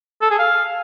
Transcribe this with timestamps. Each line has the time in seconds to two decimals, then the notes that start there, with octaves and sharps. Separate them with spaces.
0.22 A4
0.30 G#4
0.39 F5